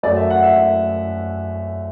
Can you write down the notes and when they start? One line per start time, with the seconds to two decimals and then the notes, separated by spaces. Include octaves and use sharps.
0.03 F#2 F#3 A3 D5
0.16 E5
0.30 F#5
0.43 E5